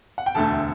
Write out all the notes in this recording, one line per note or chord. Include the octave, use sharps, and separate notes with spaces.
F#5
G5
E1 D2 D3 A3 A4 A5